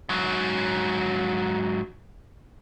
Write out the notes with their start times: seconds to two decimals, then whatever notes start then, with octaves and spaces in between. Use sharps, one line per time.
0.09 G#2 F#3